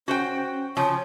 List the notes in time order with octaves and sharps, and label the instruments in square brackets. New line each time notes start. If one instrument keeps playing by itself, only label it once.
[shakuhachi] C#4 [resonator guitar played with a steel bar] F#4 C5 G5
[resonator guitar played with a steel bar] C#3 F3 [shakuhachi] C#5